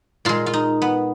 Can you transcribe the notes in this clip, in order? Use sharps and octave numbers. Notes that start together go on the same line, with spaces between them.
A#2 G#3 F4
F4
D#4
B3